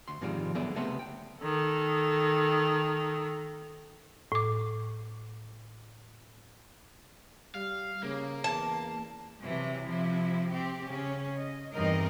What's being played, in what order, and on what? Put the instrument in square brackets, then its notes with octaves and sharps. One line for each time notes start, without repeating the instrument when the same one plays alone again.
[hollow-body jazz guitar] D2 C6
G#2 C3 D#3 F3 G3 G#3
D3 F#3 B3 G#4 D5 E5
C#2 C3 A3 B3 E5 C6
G5
[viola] D#3 A4
[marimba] A2 D6
[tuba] G3 [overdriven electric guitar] F5
[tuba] C#3 [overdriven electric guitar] A#3
[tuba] E2 [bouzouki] A5
[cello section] C3 E3 F#3
C3 F3 E4
C4 G4
C#3 C#4
D#5
E2 G2 C4 D#4 A#4 D#5